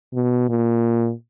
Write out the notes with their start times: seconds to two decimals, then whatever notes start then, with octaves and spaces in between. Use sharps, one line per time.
0.14 B2
0.49 A#2